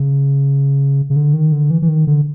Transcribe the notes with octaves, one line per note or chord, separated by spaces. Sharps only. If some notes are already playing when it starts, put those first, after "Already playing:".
Already playing: C#3
C#3
D3
D#3
D3
E3
E3
D#3
D3